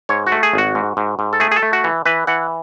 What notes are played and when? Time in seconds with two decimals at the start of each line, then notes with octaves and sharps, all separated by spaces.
0.09 G#2 C#5
0.27 F#4
0.32 A3
0.43 G#4
0.54 G#1 F#4
0.75 G#2
0.97 G#2
1.19 G#2
1.33 A4
1.40 A3 G#4
1.51 G#4
1.56 A4
1.63 A3
1.73 F#4
1.84 E3
2.06 E3 B4
2.27 E3 F#5